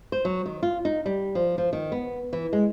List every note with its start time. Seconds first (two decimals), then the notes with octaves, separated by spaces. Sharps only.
0.12 C5
0.25 F#3
0.46 D#3
0.63 F4
0.85 D#4
1.06 G3
1.35 F3
1.58 F3
1.73 D#3
1.92 B3
2.33 E3
2.53 G#3